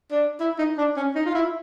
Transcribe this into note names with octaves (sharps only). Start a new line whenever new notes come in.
D4
E4
D#4
D4
C#4
D#4
F4
E4